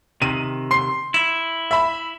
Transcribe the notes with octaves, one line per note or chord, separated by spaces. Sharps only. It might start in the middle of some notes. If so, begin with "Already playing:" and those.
C3 D#3 D#7
C6 C7
E4
E5 B5